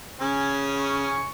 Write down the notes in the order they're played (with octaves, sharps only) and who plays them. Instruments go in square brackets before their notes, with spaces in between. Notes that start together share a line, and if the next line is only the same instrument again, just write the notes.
[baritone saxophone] C#3 [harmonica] C#4 G#5
[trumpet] C#6